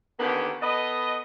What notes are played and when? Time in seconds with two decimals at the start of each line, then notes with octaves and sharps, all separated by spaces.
0.20 D3 D#3 A#3 B3 C#4 G4
0.62 B3 A4 B4 D#5